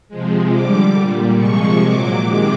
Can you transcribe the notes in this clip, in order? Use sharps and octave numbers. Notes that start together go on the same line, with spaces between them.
C3 F3 G#3
D3 G3 D6
A#2 G3
C3 F3 G#3 C#6
A#2 F#3 D6
C3 D#3 G#3 D6